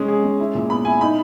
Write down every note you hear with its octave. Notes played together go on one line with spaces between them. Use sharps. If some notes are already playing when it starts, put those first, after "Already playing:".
Already playing: G#3 C#4
G#4
G#3
E4
A#2
B3 B5
E4 G#5
D#4 B5